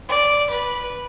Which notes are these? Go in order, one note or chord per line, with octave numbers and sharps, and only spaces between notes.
D5
B4